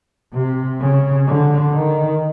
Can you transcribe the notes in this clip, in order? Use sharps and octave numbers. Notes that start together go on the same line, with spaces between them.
C3
C#3
D3
D#3